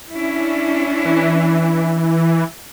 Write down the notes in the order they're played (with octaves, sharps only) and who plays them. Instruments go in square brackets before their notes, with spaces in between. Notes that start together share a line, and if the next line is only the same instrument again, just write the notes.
[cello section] C#4 D4 E4
[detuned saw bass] E3